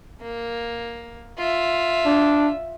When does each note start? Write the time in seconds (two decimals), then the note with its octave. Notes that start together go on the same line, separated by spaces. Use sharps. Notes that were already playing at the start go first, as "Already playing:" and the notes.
0.22 A#3
1.38 F4 E5
2.06 D4